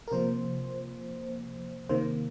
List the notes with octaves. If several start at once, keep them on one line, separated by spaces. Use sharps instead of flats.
A#4
C3 F3 A#3 C5
C3 D#3 A#3 C5